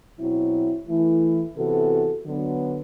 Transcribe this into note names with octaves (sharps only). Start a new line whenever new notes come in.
B2 F#3 C4 E4
E3 A3 E4
C3 E3 B3 F#4 A4
D3 F#3 B3